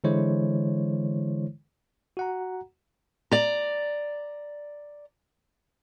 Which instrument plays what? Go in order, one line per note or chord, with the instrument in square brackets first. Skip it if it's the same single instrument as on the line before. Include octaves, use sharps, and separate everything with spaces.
[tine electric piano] D3 E3 G#3 E4 C5 C#5
F#4 F#5 A#5
[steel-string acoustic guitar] D5 A#5